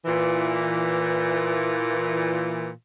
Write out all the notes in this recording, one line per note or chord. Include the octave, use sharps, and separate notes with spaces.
A#2 E3